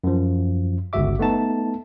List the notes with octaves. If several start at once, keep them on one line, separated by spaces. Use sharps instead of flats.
F#2 F3
G1 C#2 F#4 E5 D6
A3 B3 D#4 A5